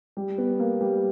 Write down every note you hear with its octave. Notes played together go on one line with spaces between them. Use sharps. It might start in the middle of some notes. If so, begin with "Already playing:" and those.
G3
B3
A#3
G3